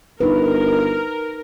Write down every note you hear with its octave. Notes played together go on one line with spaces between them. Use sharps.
G1 D#4 A#4 B4